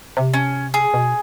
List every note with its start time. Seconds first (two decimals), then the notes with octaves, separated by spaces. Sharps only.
0.17 C3
0.34 C#4
0.74 G#4
0.94 B2